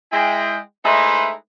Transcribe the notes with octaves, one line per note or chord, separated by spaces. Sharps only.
G#3 E4 G5
G#3 A3 D#4 E4 B4 C5